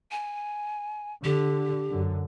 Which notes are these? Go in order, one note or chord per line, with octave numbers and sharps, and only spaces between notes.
G#5
D3 G4
F#2 D3